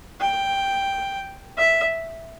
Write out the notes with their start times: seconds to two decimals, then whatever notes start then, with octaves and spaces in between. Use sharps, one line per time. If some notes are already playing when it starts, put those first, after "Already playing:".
0.21 G5
1.58 E5